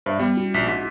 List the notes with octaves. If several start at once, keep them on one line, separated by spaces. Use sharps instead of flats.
G2 C5 D5 E5
G3 B3
C#4 E4 F#4
A#1 B6
G#2 B6